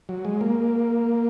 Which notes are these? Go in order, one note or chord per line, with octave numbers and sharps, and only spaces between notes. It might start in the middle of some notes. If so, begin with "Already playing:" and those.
F#3
G#3
A#3